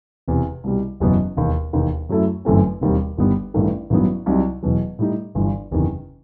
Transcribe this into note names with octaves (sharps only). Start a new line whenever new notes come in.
E1 E2 C3
C2 B2 G3
F#1 E2 B2 F#3 B3
E1 D#2 D#3
E1 D#2 D#3
F#2 F#3 A3 E4
G1 F#2 E3 A3 C4
E1 D#2 D#3 G3 C4
G1 G2 D#3 G3 B3
A1 G2 D#3 A3
A1 G2 D#3 F#3 B3
C2 C3 F#3 C4 D#4
E1 E2 B2 F#3
A2 G3 D#4
G1 G2 E3
F#1 E2 C3 D#3